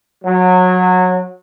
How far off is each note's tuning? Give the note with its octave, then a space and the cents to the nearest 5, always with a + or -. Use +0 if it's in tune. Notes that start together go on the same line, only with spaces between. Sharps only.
F#3 -20